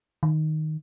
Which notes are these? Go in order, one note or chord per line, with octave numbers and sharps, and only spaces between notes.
D#3